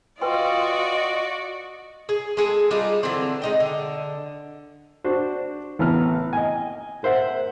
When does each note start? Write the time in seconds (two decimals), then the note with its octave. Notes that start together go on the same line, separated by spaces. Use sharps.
0.21 F4 F#4 B4 D5 D#5 G5 C6
2.09 G#4
2.37 G#3 G#4 A4
2.71 G3 D4 D#4 F4
3.03 D3 E3 C4
3.42 G#3 D#4 G5
3.60 D3
5.04 D4 F#4 C5
5.79 A1 B3 A#5 F6
6.33 D#5 G#5
7.03 A#4 C5 E5 F#5